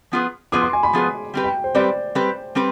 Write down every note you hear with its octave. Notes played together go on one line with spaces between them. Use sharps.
F3 B3 F4 G#4 B4
F3 B3 F4 G#4 B4 D6
C6
G#5
B5
F3 B3 F4 G#4 B4
G3 C4 G4 B4
G5
C5
G3 C4 G4 B4 D5
G3 C4 G4 B4
G3 C4 G4 B4